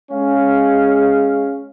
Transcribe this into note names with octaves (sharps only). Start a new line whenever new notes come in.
G#3 C#4 F5